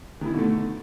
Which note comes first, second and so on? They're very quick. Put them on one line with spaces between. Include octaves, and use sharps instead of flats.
D#3 E4 B2 D3 A3